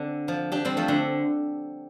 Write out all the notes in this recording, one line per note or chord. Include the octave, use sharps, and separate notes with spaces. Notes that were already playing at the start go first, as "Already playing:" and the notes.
Already playing: D3 C4
F3
D4 G4
G3 C4
F3 A3
D3